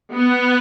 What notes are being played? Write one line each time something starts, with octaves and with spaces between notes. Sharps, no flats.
B3